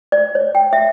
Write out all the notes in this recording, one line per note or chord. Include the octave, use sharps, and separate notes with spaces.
D5
C#5
G5
E5